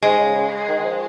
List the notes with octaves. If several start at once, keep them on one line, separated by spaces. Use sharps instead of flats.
G#2 G#3
C#3
C#3
D#3
D#3
F3